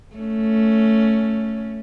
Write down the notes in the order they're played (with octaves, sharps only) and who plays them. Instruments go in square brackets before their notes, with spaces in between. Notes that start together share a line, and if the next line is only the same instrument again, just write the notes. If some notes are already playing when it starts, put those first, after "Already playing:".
[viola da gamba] A3 C#4